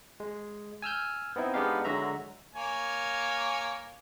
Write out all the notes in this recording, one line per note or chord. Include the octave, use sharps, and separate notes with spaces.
G#3
G#5 E6 F6 G6
B3 C4 D#4 E4
G#3 B3 D4 D#4 G4 F5
D3 F#3 G#3 F#4 E5 A#5
A#3 C#5 G#5